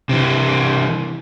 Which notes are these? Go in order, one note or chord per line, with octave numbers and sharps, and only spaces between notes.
C3 E3